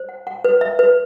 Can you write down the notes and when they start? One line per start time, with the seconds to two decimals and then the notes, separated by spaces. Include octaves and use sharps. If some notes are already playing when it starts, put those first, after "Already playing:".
Already playing: C5
0.09 F#5
0.27 F#5
0.44 B4
0.61 E5
0.79 B4